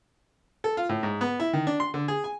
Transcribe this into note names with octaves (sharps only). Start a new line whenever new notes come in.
A4
F4
A2
G#2
B3
E4
D#3
D4
C6
D3
G#4
G#5